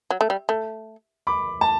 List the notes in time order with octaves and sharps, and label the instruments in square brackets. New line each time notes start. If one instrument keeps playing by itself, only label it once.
[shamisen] F#3
A3
G3
A3
[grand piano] B5 D6
A5